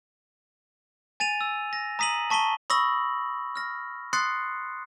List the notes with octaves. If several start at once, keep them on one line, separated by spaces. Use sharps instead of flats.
G#5 A6 D#7 F7
E6
A#6
A#5 D#6 B6 D#7 F#7
A5 C#6 B6 D#7 G7
B5 C#6 D#6 E6 A#6 F#7
F6 A#6
C6 D#6 F#6 A6 C7 C#7